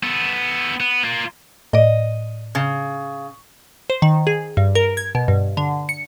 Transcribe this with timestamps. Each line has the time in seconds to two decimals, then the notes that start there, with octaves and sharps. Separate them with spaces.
0.03 B3 A4
0.80 B3
1.03 A#3 F4
1.73 A2 D5 D#5
2.55 C#3
3.90 C5
4.02 D#3
4.27 G#4
4.57 G2
4.75 A#4
4.97 G#6
5.15 B2
5.28 G2
5.57 D3
5.89 C#7